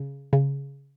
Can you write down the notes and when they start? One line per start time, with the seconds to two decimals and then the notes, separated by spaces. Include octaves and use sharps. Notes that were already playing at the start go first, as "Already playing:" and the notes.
Already playing: C#3
0.33 C#3